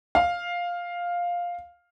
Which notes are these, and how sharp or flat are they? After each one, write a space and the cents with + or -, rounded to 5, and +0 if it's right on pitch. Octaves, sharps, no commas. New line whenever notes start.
F5 +5